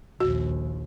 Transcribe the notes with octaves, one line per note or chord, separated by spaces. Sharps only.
A#1 D#2 F#4